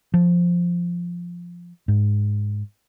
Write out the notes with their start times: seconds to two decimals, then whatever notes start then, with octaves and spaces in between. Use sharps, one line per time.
0.14 F3
1.88 G#2